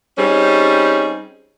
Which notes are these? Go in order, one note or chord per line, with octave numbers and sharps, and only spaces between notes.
G3 C4 C#4 D#4 G#4